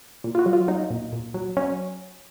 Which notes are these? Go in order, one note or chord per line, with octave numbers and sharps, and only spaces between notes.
A#2
F4
F#4
F#3
F4
F#3 D#4
A#2
A#2
F#3
F#3 C#4